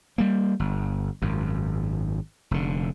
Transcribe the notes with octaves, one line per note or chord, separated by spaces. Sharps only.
G3 A#3
G1
G#1 F#2
F1 D3